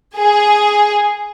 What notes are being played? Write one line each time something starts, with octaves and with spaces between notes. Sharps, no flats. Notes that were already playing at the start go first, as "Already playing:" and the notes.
G#4